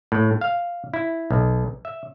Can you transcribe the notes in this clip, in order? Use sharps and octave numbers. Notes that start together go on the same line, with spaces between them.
A2
F5
E4
B1
E5